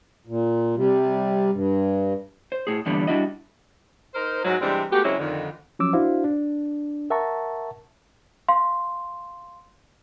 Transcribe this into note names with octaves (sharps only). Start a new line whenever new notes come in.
A#2
C3 G3
G2
C5
A2 G#4
E2 G2 A#2 D3 G3 B3
G3 D4 E4 F#4 D#5
D#4 A#4 C5
G#2 F#3
C3 E3 G3 G#3 C4 D4
G#3 A3 B3 F#4 G4
C#3 F#3 G#3 C4 C#4 E4
F2 D3 D#3
F3 F#3 C#4 D6 E6
D4 E4 F#4 C5 F5
D4
A#4 E5 F#5 A5 A#5 C#6
F5 C6